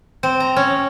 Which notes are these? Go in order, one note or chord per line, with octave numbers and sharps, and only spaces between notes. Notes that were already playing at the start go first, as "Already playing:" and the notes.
C4
A#5
C#4